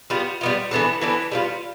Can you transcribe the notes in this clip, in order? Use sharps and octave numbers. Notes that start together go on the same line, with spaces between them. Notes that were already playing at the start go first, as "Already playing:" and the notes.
G3 B3 F4
G3 B3 F4
E3 B3 D4 A4
E3 B3 D4 A4
G3 B3 F4